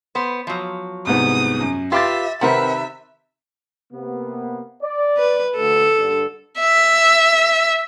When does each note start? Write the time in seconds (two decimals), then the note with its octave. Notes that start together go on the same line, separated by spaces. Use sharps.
0.15 B3 C5
0.47 F3 F#3
1.07 C2 G#2 B3 D#6
1.60 F#2
1.92 F4 G4 B4 E5 C6 D6 A6
2.41 C3 D#3 C4 A#4 B4 E5 F#5
3.93 C3 A#3 B3
4.83 D5
5.18 B4
5.56 D2 A4
5.97 G2 D3
6.59 E5